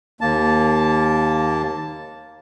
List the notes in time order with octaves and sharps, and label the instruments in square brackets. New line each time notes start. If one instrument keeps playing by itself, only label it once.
[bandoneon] D#2 A#3 A5